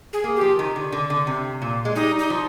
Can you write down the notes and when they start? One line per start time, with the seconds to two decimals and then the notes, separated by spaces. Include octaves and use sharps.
0.13 G#4
0.24 A#3
0.36 G4
0.41 F3
0.59 D#3
0.76 D3
0.92 D3
1.10 D3
1.27 C3
1.62 A#2
1.85 G#3
1.95 G3 D#4
2.19 D#4
2.30 F3